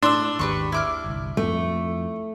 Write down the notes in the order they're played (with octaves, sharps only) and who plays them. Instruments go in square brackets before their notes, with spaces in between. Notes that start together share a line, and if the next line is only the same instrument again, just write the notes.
[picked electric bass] A2 [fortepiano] D4 [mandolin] C6 E6
[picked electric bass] G#1 D#2 [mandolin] G4 B4 C#6
[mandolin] E4 D6 F6
[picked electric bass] G1 C2
[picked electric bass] F2 [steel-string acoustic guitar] A3